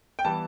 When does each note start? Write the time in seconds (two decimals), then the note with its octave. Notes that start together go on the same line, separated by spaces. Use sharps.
0.19 G5
0.25 E3 G3 B3 A5